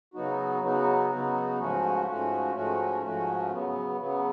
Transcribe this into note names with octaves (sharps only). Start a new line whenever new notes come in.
C#3 F#3 B3 D#4 F#4
C#3 F#3 B3 D#4 F#4
C#3 F#3 B3 D#4 F#4
G#2 F3 A3 C#4 F#4
G#2 F3 A3 C#4 F#4
G#2 F3 A3 C#4 F#4
G#2 F3 A3 C#4 F#4
C#3 F#3 B3
C#3 F#3 B3